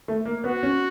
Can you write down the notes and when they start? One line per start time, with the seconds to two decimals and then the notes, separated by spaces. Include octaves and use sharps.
0.08 A3
0.25 A#3
0.44 B3 F#4
0.63 C#4